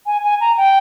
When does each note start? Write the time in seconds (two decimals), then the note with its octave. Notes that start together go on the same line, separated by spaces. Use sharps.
0.06 G#5
0.23 G#5
0.41 A#5
0.57 G5